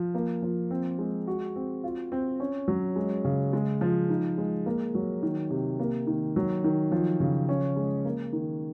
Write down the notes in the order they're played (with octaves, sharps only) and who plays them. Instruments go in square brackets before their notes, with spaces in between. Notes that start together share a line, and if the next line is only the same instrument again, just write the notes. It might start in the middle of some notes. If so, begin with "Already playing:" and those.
Already playing: [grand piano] F3
A#3
F3
C4
G#3
F#4
C4
F4
C4
C#4
F#3
G#3
C#3
G#3
F3
D#4
G#3
A#3
F#3
D#3
C3
A#3
D#3
F#3
D#3
F3
C#3
C#4
G#3
A#3
D#3